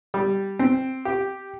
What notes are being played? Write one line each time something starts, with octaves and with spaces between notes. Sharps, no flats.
G3
C4
G4